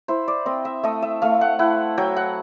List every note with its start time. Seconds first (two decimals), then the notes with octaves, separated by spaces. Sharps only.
0.08 E4 C5
0.28 D5
0.46 C4 D#5
0.65 E5
0.83 A3 D#5
1.02 E5
1.22 A3 F5
1.41 F#5
1.59 E4 F#5
1.98 F#3 G5
2.16 F#5